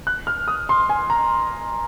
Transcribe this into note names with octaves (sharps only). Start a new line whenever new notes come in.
F#6
F6
D#6
C6
G#5
A#5